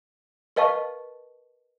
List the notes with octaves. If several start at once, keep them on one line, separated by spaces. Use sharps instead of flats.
A#4 B4 D#5 F5 A5 C#6